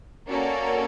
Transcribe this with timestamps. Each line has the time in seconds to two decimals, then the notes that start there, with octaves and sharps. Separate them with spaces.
0.29 A#3 C#4 F#4 A4 D5